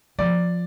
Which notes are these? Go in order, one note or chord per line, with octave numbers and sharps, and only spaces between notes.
F3 D5